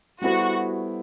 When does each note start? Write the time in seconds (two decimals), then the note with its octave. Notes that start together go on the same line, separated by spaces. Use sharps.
0.22 G3 B3 E4 F#4 A4 C5